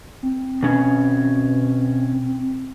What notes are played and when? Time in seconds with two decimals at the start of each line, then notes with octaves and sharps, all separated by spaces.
0.23 C4
0.63 B2 C#4